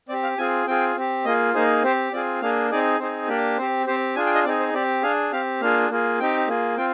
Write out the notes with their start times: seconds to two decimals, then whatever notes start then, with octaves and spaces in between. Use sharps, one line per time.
0.09 C4 D5
0.13 G4
0.23 F5
0.38 C4 F4 G#4 G#5
0.66 C4 F4 G#4 G5
0.96 C4 G4
1.25 A#3 F4 G#4 D#5
1.54 A#3 D#4 G#4 C5
1.83 C4 G4 C5
2.12 C4 F4 G#4 D5
2.41 A#3 D4 G#4 F5
2.71 C4 D#4 G#4 D5
2.99 C4 D#4 G#4 C5
3.28 A#3 D4 G4 D5
3.58 C4 G4 C5
3.87 C4 G4 C5
4.16 D4 F4 G#4 G#5
4.26 G5
4.35 D#5
4.44 C4 D#4 G#4 D5
4.60 C5
4.74 C4 G4 D5
5.03 D4 G#4 F5
5.32 C4 G4 F5
5.61 A#3 D4 F4 G#4 F5
5.90 A#3 F4 G#4
6.19 C4 D#4 G4 G5
6.48 A#3 F4 G#4
6.77 C4 F4 G5